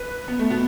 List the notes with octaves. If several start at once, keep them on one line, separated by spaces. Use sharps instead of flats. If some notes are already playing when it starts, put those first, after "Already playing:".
Already playing: B4
B3
A3
B2 B3